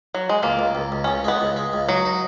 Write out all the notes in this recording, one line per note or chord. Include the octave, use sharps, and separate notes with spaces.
F#3
G#3
C#2 A#3
C#2
C#2
C#2
C#2 C#4
G#3 B3
C#2
G#3
C#2
F#3 D#4
D#4